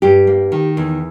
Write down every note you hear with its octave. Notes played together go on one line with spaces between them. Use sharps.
G2 G4
A#3
D#3
E2